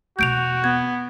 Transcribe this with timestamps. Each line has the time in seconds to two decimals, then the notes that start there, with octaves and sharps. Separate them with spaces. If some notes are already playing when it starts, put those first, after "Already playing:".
0.19 E2 B2 F#4 G6 D7 F7
0.64 B3 G#6